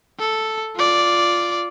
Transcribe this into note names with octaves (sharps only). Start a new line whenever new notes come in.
A4
F4 D5